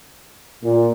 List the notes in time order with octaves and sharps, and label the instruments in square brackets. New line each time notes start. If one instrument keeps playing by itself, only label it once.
[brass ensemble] A#2